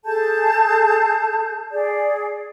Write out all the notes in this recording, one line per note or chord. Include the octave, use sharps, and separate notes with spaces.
G#4 A4 A5 G6
G#4 D5